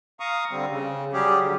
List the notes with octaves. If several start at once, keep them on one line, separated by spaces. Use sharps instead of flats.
F5 A#5 C#6 D#6
D3 G3 C4
C#3
F#3 G3 C#4 G4 G#4
D3